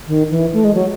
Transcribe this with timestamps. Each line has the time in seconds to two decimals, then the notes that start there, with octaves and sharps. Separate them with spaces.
0.07 D#3
0.31 E3
0.53 A3
0.64 G#3
0.75 F#3